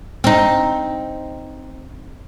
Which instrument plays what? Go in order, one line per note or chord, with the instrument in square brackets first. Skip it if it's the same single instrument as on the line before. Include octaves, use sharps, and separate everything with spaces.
[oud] C4 D#4